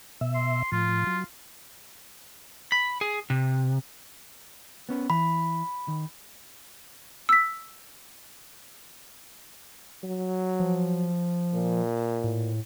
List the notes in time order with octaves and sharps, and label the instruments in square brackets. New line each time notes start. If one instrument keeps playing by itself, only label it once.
[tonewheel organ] B2 E5
[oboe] C6
[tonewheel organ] A2 F3 [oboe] F4
[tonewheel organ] F#3
[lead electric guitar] B5
G#4
C3
[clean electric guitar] B3 C#4 B4
[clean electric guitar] E3 [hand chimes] B5
[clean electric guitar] D#3
[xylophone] E6 B6
[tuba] F#3
[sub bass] F3
[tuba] A#2
[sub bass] A2